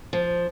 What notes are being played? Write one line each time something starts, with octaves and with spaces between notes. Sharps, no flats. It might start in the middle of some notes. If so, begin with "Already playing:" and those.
F3